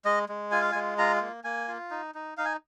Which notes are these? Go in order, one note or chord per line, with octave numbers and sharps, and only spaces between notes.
G#3 D#5
G#3
F4 G#5
F5
G#5
G#3
F4 A#5
A#3
A#3 G#5
F4
D#4
D#4
D#4 F5
G#5